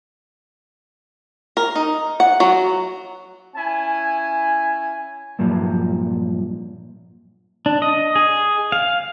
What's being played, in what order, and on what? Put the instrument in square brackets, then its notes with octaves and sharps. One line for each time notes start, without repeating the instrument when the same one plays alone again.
[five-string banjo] A#4
D#4
F#5
F#3
[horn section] C#4 E4 G#5
[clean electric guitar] G2 A#2 F3 F#3
[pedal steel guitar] D4
D#5
G#4
F5